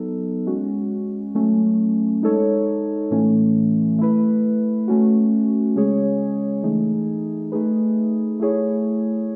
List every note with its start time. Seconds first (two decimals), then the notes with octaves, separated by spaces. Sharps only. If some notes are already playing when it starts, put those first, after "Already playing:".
Already playing: F#3 B3 D#4 A4
0.46 G#3 C#4 F#4
1.35 F#3 A3 C#4
2.23 G#3 D#4 A4 C#5
3.11 A2 E3 A3 C#4
3.99 A3 E4 B4
4.88 A3 C#4 F#4
5.76 C#3 G#3 C#4 G#4 C#5
6.63 E3 A3 D#4 G#4
7.52 A3 D#4 G#4 B4
8.40 A3 E4 G#4 C#5